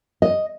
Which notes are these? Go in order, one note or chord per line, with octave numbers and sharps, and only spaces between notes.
D#5